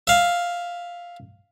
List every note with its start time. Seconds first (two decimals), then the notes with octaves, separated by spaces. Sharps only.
0.07 E5 F5